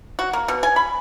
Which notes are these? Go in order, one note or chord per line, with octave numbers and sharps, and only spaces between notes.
F#4
A#3
B2
G#5
B5